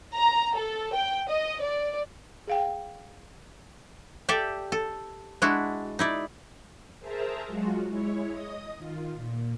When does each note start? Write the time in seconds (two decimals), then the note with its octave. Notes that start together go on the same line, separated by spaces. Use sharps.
0.15 A#5
0.56 A4
0.93 G5
1.29 D#5
1.62 D5
2.48 G#4 F5 G5
4.29 G4 A4 D5 E5 G5
4.72 A4
5.42 G#3 D4 E4 F#4
5.99 D#4 E4 D5
6.99 G#4 A#4 C5 E5 A5 A#5
7.47 F#3 G#3 F4 F#4
7.86 G#3 E4 C#5
8.30 D#5 D#6
8.77 D#3 F4
9.14 A#2